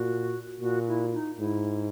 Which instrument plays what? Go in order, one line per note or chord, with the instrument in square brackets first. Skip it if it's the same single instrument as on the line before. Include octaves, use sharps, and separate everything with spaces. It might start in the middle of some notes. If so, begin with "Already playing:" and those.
Already playing: [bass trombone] A#2 [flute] F#4
[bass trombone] A#2 [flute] F#4
[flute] E4
D#4
[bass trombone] G#2 [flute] E4